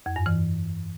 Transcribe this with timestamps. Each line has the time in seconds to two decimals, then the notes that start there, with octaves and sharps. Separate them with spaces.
0.06 F2
0.16 G2
0.26 E3